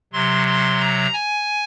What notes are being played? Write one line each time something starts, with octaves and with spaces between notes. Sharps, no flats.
C3 F#3 C6
C6
A#5
G#5